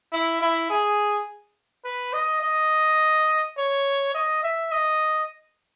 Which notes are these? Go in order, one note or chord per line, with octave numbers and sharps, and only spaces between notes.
E4
E4
G#4
B4
D#5
D#5
C#5
D#5
E5
D#5